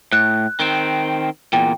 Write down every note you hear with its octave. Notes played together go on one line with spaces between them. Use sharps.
A2 F#6
D#3 C4
E2 A#2 G5